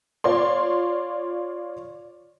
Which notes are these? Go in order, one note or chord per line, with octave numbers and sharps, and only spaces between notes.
F4 C#5 D5 C6